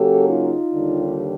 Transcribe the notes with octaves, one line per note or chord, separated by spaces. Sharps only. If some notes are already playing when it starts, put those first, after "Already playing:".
Already playing: C#3 F#3 A#3 C#4 G4 A4
D#4 F4
D#2 D3 G3